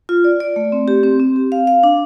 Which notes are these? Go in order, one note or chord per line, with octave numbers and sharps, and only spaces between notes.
F4
D5
D5
A3
C4
G4
C4
C4
G4
F5
F5
D4